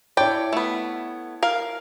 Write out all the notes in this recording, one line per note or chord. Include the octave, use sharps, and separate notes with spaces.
E4 C#5 D5 G5 A5
A3 B3
A#4 F5